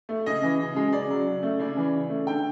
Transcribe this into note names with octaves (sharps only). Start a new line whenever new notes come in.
A3
C#3 D#5
E3
C#3
G#3
C#3 D5
F#3
C#3
A3
C#3 D5
E3
C#3
A3
D3 G5